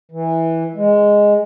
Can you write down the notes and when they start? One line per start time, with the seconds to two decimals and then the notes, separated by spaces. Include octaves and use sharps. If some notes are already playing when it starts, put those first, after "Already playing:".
0.12 E3
0.75 G#3